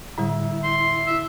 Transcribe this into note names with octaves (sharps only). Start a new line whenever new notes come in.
A2 D3 G3 E4
C6
E5